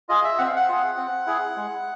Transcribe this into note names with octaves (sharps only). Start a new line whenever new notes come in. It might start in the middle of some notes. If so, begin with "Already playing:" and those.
F4 G#4 D#5
E5
C4 F#5
F5
F#5
F4 G#4
C4
E4 G#4
G#3